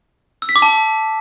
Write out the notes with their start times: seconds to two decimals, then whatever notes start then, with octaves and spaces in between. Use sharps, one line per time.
0.42 E6
0.49 B6
0.56 D6
0.62 A5